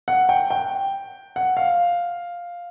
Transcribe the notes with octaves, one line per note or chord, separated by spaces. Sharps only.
F#5
G5
G5
F#5
F5